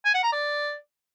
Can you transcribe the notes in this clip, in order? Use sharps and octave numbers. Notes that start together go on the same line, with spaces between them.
G#5
F#5
A#5
D5